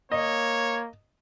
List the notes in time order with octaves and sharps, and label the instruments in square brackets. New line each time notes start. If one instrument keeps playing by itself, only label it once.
[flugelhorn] A#3 [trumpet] C#5 [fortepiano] D#5